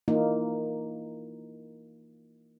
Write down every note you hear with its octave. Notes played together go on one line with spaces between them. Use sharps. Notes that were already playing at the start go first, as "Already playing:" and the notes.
E3 A#3 D#4 F4